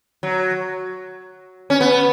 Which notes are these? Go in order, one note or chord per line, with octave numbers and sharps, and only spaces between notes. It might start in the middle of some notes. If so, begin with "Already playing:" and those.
F#3
C#4
B3